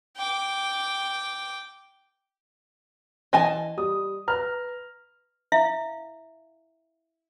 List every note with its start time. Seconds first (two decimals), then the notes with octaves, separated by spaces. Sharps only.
0.16 G5 D6
3.33 E3 D#5 G#5 A5
3.77 G3 D#6
4.27 B4 A#5 F6
5.52 E4 E5 F5